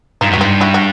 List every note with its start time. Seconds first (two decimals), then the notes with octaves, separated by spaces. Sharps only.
0.21 G2 D#4 F4
0.30 F#2
0.33 F#4
0.37 G2 D#4 F4
0.61 E4 F#4
0.74 F#4